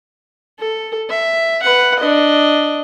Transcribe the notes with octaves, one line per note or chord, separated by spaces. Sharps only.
A4
E5
B4 F#5
D4 D#5